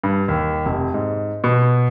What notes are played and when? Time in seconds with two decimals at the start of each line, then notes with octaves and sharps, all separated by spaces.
0.03 G2
0.28 D#2
0.66 F1
0.94 G#2
1.44 B2